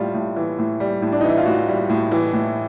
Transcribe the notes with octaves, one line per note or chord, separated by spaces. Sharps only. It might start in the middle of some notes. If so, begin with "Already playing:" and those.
Already playing: A2 G3 F4
A2
E3
A2
G3
A2
D4
E3 D#4
E4
F4
A2 F#4
G3
A2
E3
A2